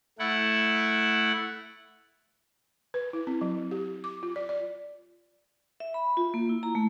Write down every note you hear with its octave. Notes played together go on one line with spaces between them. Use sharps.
A3 E4 F#5
B4
E4
C4
F#3
G4
D6
F4
D5
D5
E5
B5
F4
A#3
E4
A#5
A3